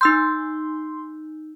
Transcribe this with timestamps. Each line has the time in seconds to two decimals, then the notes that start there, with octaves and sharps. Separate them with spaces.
0.01 D#4 C6 E6 G6